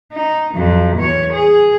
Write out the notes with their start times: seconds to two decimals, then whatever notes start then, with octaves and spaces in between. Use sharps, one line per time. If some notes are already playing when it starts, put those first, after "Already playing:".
0.12 D#4
0.54 F2 F#3
0.96 E2 C#5
1.33 G#4